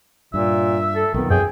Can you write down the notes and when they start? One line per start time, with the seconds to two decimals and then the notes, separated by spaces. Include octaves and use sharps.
0.34 G2 A#2 E5
0.96 A4
1.14 B1 F2 D#3 B3
1.30 F#2 G#4 G5